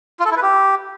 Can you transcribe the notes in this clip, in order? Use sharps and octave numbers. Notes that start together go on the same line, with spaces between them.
F4
A4
E4
B4
G4